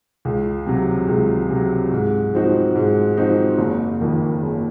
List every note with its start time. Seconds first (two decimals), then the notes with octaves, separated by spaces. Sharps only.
0.25 C#2
0.66 C3 F#3
1.08 C#2
1.50 C3 F#3
1.91 G#2
2.34 F3 C4 D#4 F#4
2.75 G#2
3.17 F3 C4 D#4 F#4
3.58 F#1
4.01 F2 D#3
4.42 F#1